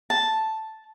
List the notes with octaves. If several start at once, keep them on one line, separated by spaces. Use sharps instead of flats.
A5